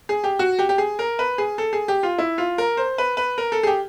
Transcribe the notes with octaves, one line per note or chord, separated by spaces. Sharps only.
G#4
G4
F#4
G4
G4
G#4
A#4
B4
G#4
A4
G#4
G4
F4
E4
F4
A#4
C5
B4
B4
A#4
A4
G#4
G4